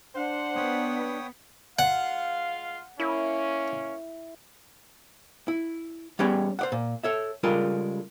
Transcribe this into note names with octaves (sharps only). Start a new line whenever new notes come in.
D4 C5 F#5
B3 C#5 G5 D#6
G#3 F4 F5 F#5
A#3 C#4 E4
E4
G3 B3 C#4 G#4 C#5 G5
C5 D5 F#5
A#2
A4 C#5 E5
C#3 G3 G#3 F4 A4 A#4